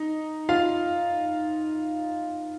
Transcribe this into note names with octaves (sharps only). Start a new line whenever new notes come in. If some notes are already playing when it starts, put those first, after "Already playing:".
Already playing: D#4
F4 F5